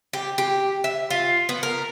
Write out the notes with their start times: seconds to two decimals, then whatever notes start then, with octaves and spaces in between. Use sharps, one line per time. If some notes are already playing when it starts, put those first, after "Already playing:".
0.13 G4
0.38 G4
0.84 E5
1.10 F4
1.49 B3
1.63 A#4